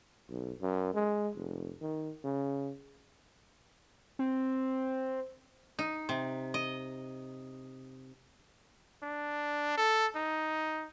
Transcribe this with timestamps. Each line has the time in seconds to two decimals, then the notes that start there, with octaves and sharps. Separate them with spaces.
0.30 B1
0.62 F#2
0.94 G#3
1.35 F1
1.81 D#3
2.25 C#3
4.19 C4
5.79 D#4
6.09 C3
6.54 D#5
9.03 D4
9.77 A4
10.15 D#4